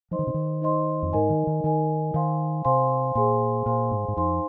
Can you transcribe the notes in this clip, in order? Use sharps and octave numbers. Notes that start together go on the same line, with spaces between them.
F3 D#4 C5 D#5 C6
D#3
C3
D#3
D#4 C5 D#5 C6
F2
G#2 D#4 A#4 D#5 G#5
D#3
D#3
D#3 D#4 A#4 D#5 G#5
D#3 C5 F5 G#5 C6
C3 C5 F5 G#5 C6
A#2 G#4 C5 F5 G#5 C6
A#2 G#4 C5 F5 G#5 C6
G#2
G#2
F2 D#4 C5 F5 G#5 C6